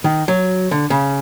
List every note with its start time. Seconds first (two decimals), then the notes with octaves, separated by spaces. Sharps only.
0.04 D#3
0.28 F#3
0.71 D3
0.90 C#3